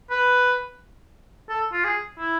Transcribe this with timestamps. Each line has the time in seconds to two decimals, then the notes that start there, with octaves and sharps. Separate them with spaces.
0.11 B4
1.49 A4
1.73 F4
1.84 G#4
2.19 E4